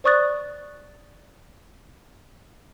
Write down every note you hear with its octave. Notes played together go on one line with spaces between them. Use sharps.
C5 D5 C#6 D#6 F#6 A6